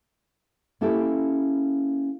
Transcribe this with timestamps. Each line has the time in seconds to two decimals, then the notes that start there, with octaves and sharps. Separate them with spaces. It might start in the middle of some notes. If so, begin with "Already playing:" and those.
0.81 A#3 C#4 E4 G4 A4